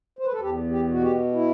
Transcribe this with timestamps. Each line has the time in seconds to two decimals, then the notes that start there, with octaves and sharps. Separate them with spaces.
0.19 C5
0.25 B4
0.33 A4
0.40 E2 G4
0.71 G4
0.87 B2 F#4
1.02 G4
1.34 E4